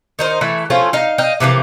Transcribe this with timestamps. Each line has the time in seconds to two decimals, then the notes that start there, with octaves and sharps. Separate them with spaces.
0.19 D#3 D#4 C5
0.41 E3 A3 E4
0.70 F3 A3 C#4 F4
0.93 D#4 F5
1.18 D#5 F5 G5
1.40 C3 E3 F3 A#3